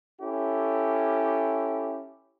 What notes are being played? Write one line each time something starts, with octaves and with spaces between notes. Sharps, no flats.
C#4 E4 G4 A4